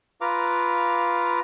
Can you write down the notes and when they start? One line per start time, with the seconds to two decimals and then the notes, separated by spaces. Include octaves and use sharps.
0.21 F4 B4 F5 A#5 D6